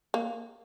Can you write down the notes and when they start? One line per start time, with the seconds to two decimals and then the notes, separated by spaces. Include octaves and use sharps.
0.14 A#3